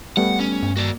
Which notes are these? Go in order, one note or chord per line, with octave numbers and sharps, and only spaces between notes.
G3 A3 B3 F#5
C#4
G2
A#3 F#4 D5